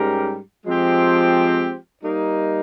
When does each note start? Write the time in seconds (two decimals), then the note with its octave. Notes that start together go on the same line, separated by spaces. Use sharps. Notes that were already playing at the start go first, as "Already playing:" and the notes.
Already playing: G#2 G3 C#4 G4 A#4
0.65 F3 G#3 C4 G4
2.03 G3 A#3 D#4